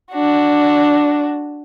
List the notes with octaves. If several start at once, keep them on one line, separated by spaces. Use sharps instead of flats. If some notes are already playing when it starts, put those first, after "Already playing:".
D4 F#4